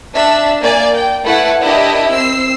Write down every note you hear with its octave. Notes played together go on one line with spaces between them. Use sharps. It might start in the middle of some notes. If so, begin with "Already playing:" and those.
D4 E5
A#3 D5 G#5
G5
A3 E4 B4 F#5
D4 E4 G4 A#4 D#5 E5
C4 E6 C7